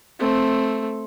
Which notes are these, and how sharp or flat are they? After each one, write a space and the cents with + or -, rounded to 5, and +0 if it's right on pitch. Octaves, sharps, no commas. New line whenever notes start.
A3 +0 C4 +5